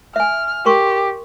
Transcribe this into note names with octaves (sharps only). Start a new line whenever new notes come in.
E5 G#5 F6
G4 A#4 C6 C#6